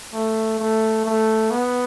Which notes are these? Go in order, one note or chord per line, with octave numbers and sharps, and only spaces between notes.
A3
A3
A3
B3